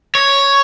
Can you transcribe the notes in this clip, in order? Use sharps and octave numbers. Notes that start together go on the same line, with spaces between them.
C#5